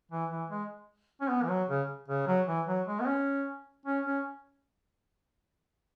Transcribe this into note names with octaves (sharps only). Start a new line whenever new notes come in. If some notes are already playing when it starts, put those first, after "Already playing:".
E3
E3
G#3
C#4
B3
E3
F#3
C#3
C#3
F#3
E3
F#3
G#3
B3
C#4
C#4
C#4